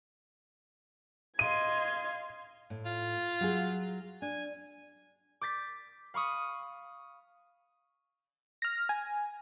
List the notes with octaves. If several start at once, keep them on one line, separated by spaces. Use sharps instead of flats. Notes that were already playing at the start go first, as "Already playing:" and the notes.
D#5 F5 C6 G#6 D#7
A2
F4
F#3 G#4
D4 G#5
D6 G6 A6 B6
F5 B5 C#6 D#6
F6 A#6
G#5